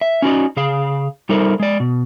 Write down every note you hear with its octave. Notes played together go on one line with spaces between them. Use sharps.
E5
C#4 D#4 F#4 A4 D5 D#5
C#3 G#4 F5
G3 D#4 A4 A#4 C5 E5
G#3 D5
B2